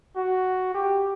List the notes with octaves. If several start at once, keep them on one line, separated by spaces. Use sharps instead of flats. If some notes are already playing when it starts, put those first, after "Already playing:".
F#4
G4